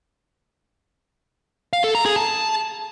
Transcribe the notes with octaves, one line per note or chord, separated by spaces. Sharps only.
F5
A4
A#5
G#4
A5